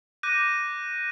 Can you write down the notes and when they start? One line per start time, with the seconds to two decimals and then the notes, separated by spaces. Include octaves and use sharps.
0.23 D6 F#6 G6 A#6 D#7